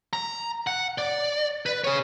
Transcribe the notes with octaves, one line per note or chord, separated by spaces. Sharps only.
A#5
F#5
D5
B4
G#4 C#5